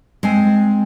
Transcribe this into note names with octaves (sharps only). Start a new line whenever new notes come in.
G#3 C4 G#5